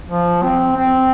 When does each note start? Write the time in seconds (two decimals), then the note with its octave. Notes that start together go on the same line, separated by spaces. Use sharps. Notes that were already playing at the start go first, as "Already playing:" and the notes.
0.09 F3
0.43 C4
0.76 C4